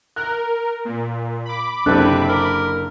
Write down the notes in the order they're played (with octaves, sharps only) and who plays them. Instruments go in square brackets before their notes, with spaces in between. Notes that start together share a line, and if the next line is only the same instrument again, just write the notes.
[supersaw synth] A#4 [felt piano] F#6
[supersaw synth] A#2
B5 D6
[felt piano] F#1 A4 F#6 [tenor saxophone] C3 [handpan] D4
[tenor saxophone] A#4